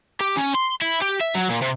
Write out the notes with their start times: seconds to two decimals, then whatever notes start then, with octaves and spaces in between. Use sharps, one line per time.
0.21 G4
0.37 C#4
0.55 C6
0.82 E4
1.01 G4
1.20 E5
1.35 F#3
1.49 A#2
1.62 C3